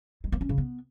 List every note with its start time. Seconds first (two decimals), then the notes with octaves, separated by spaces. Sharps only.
0.24 G#3
0.32 A#3
0.41 C#4
0.49 C#3
0.58 B3